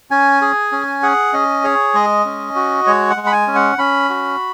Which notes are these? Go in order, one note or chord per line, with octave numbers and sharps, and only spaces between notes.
C#4 G#5
G#4
C#4
G#4 F#5
C#4 D#5
G#4 C#5
G#3 D#5
C#4
F#4
G#3 C#5
F#5
G#3
B5
G#5
C#4
F#5
C#4 B5
F#4